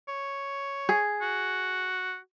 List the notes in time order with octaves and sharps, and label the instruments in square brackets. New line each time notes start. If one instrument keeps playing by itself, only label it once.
[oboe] C#5
[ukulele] G#4
[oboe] F#4